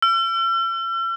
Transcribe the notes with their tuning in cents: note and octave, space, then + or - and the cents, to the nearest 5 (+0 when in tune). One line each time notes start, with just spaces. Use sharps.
E6 +45